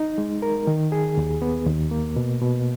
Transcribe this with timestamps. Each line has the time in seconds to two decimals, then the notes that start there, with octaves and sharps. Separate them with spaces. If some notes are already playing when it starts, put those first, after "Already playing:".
Already playing: D#4
0.18 G#3
0.42 A#4
0.67 D#3
0.92 G#4
1.17 D#2
1.42 B3
1.67 D#2
1.91 A#3
2.16 B2
2.41 B2